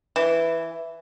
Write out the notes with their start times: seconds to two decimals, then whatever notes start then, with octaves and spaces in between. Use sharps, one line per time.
0.16 E3